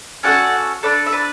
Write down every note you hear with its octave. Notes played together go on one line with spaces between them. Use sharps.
C#4 F#4 A4 D5 F#5
D4 A4 B4 D5
E5
B4 D5